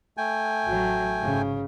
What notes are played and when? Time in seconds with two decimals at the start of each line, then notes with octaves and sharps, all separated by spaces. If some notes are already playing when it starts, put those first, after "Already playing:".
0.17 A3 G5 G#5
0.65 A1 F#3
1.18 G#2 C#3